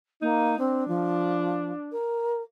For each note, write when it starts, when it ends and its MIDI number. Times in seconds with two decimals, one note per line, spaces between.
0.22 0.58 58
0.22 0.58 63
0.59 0.86 60
0.59 1.92 62
0.88 1.72 53
1.92 2.42 70